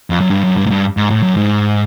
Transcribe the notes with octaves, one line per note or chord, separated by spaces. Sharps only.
F2
F#2
G2
F#2
G2
G#2
G2
G#2
A2
F#2
G#2